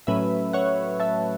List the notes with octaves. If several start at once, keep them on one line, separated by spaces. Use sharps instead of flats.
A2 F#3 A3 C#4 B4 E5
C#5 F#5
E5 A5